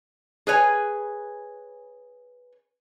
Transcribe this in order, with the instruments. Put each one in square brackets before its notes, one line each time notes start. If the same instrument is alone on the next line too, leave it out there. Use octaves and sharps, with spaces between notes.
[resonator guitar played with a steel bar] G#4 B4 C#5 G#5